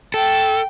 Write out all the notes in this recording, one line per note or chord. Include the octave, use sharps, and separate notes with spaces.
A4 G5